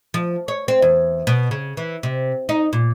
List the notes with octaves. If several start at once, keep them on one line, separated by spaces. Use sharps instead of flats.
F3
C#5
C4
E2
B2
C#3
E3
C3
D#4
A#2